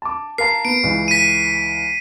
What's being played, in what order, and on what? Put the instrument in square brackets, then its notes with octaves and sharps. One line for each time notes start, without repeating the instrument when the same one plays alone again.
[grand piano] A5 D6
[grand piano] A#4 F5 A5 [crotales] C7
[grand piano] B3 [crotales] D7
[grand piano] C#2 E3
[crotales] B6 D#7